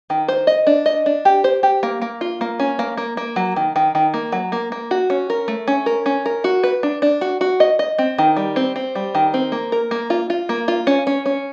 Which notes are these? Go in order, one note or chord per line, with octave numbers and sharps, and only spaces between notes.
D#3
C5
D#5
D4
D#5
D4
G4
C5
G4
A#3
A#3
F4
A#3
C#4
A#3
A#3
A#3
F#3
D#3
D#3
D#3
A#3
F#3
A#3
A#3
F#4
C#4
A#4
A3
C#4
A#4
C#4
A#4
F#4
B4
D4
D4
F#4
F#4
D#5
D#5
C4
D#3
G3
C4
C4
G3
D#3
C4
A#3
A#4
A#3
F4
F4
A#3
F4
C#4
C#4
C#4